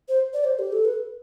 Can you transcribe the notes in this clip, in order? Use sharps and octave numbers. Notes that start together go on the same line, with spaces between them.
C5
D5
C5
G4
A4
B4